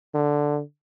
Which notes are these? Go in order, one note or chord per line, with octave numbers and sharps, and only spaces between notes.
D3